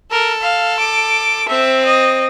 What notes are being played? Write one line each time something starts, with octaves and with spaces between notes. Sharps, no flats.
A4 A#4
F5
D6
C4 E5
D#5